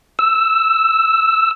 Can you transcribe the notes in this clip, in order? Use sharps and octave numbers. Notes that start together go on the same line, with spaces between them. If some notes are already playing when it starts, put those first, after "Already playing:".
E6